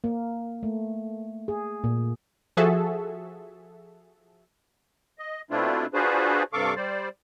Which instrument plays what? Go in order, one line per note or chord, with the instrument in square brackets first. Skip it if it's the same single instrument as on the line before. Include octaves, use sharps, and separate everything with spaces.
[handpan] A#3
A3
G#4
A#2
[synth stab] F3 F#4 G#4 A4 E5
[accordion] D#5
B2 A3 C4 D4 E4 F4
D4 F4 F#4 G#4 B4 C5
G2 C3 A4 F5 C#6 D6
G3 C5 D5